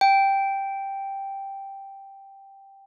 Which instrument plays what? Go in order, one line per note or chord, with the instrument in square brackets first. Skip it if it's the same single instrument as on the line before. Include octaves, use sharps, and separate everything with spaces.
[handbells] G5